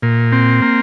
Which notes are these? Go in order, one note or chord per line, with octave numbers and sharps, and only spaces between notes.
A#2
C4
A#3